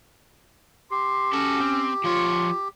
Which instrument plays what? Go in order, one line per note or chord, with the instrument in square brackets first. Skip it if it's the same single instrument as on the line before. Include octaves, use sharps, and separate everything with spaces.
[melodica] G4 [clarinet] C6
[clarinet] C#4 [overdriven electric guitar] F#4 A4
[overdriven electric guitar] C4
[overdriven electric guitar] F3 C#5 [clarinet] F4